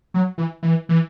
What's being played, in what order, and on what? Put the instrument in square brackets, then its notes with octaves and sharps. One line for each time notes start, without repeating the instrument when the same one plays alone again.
[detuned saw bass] F#3
E3
E3
E3